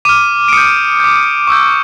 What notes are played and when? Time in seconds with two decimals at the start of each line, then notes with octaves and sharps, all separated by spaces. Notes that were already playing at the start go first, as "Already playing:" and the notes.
0.05 D6 F6 D#7
0.48 D7
0.53 D#6 G6 C#7
1.00 D6 G6
1.47 C#6 E6 G6